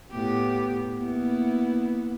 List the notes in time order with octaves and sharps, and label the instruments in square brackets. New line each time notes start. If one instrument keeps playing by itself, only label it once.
[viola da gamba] A2 B3 G4
A#3 B3 E4